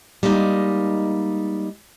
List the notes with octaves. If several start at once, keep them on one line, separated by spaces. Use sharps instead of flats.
G3 G#3 A#3 D#4